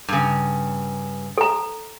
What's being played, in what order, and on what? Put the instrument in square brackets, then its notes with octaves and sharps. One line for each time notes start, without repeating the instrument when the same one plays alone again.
[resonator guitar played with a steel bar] G2 C#3
[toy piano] A4 A#5